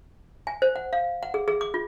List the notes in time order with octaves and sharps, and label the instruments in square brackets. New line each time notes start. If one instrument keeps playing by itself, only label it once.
[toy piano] G#5
C5
F#5
F5
F#5
G#4
G#4
D6
F4